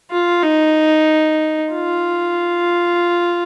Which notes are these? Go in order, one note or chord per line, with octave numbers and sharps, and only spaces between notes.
F4
D#4
F4